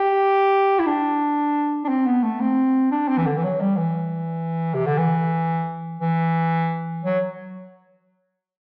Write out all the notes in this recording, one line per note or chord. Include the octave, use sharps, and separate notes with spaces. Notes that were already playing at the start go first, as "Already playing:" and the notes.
Already playing: G4
E4
D4
D4
C4
B3
A3
C4
D4
C4
E3
D3
E3
F#3
G3
E3
C3
D3
E3
E3
F#3